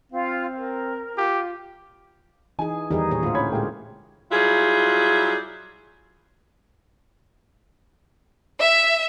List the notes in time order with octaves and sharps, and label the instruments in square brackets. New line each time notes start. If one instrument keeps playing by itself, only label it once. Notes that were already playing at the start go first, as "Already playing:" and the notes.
[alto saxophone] C4 [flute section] F4 F5
[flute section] A#4
[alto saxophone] F4 [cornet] G4
[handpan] E3 G#4 [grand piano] D#4 [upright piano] G#5
[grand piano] E2 [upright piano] D#3 G3 [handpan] D#4 G#4
[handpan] A#2 G#4 C#5
[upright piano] D2 A2 [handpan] F4 C5
[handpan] C#4 E4 [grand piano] C#5 B5 G#6
[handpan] A#2 G4 [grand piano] G#3 A#3 G5
[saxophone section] F#3 G3 E4 F4 G#4
[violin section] E5